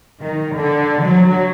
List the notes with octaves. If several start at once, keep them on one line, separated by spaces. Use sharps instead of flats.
D#3
D3
F#3